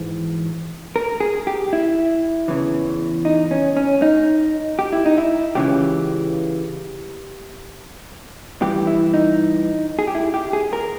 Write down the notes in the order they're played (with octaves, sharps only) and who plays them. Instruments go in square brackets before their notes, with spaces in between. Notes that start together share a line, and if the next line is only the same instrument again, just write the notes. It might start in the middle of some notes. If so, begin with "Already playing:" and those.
Already playing: [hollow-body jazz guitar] G#2 E3
A#4
G#4
G4
E4
E2 C#3 E3
D#4
C#4
C#4
D#4
G4
E4
D#4
E4
C#2 C#3 E3 G4
G2 E3 G4
E4
D#4
G#4
G4
E4
G4
G#4
A#4